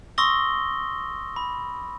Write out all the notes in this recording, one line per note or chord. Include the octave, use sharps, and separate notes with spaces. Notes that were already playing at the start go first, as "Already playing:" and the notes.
C6 C#6 D#6 E6 A#6 G7
B5